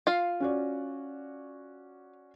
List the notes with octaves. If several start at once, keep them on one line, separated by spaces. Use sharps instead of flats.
F4 F5
C#4 F#4 D5